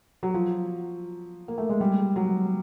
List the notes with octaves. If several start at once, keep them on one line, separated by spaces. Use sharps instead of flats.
F#3
F3
A#3
A3
G#3
G3
F#3